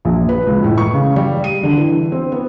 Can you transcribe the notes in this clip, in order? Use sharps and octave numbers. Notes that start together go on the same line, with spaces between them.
A#1
B4
C#2
A2
C#6
C#3
G3
D#7
D3
E3
C4
B3